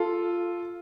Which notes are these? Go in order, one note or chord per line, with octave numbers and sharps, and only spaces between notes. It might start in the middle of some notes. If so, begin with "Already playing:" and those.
Already playing: F4 A4